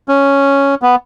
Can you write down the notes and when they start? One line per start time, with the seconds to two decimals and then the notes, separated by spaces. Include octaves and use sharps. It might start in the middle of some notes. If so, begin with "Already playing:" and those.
0.08 C#4
0.82 B3